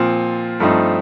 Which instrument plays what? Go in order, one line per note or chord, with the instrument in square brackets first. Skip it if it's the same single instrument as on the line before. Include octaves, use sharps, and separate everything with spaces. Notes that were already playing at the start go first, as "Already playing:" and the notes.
Already playing: [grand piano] A#2 F3 C4 F4
G2 F3 A3 C4 D#4